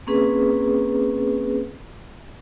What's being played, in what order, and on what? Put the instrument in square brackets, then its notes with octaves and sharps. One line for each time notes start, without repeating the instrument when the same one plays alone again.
[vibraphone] A#3 C4 C#4 G#4 B4